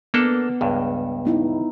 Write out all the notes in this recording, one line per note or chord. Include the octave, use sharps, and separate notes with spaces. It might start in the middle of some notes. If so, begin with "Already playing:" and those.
A#3 B3 D4 A4
C#2 G2
B3 D#4 E4